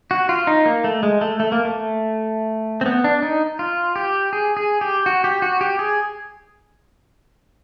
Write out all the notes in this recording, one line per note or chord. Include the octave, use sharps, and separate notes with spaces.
F#4
F4
D#4
A#3
A3
G#3
A3
A3
A#3
A3
C4
B3
D4
D#4
F4
G4
G#4
G#4
G4
F#4
G4
F#4
G4
G#4